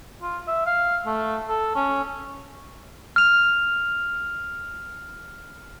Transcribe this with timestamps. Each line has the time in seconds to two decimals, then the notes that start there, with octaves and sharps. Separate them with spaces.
0.22 F4
0.48 E5
0.66 F5
1.06 A3
1.49 A4
1.76 C#4
3.16 F6 F7